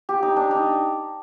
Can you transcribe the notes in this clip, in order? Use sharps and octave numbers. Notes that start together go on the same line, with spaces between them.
G4
D#4
D4
D#4